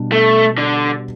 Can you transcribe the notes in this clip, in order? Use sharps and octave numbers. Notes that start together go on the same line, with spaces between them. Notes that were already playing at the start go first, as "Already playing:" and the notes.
Already playing: B2 G3 D4
A3
D3